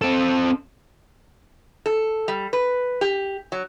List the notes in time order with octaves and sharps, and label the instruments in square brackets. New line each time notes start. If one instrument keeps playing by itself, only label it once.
[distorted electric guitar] C4 A4
[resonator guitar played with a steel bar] A4
G3
B4
G4
F#3